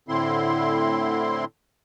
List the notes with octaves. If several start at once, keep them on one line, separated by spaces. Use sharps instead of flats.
A2 D3 C4 E4 C6